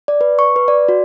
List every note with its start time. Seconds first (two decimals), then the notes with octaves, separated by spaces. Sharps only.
0.08 D5
0.21 B4
0.39 C#6
0.56 B4
0.68 D5
0.89 F#4